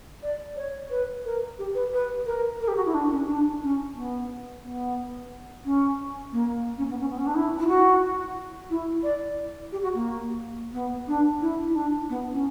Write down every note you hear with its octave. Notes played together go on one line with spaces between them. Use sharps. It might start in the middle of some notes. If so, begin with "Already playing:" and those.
D5
C#5
B4
A#4
G4
B4
B4
A#4
A#4
G4
F#4
E4
D4
C#4
D4
C#4
B3
B3
C#4
A#3
C#4
B3
C#4
B3
C#4
D4
E4
E4
F#4
E4
D5
G4
F#4
A#3
B3
D4
E4
E4
D4
B3
C#4